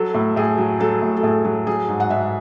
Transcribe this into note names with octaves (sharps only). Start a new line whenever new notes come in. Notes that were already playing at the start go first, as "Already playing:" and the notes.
Already playing: F#3 A4
A2
A2 G#4
F#3
F#3 A4
A2
A4
A2 G#4
F#3
F#3 G#4
G#2
F#5
G#2 E5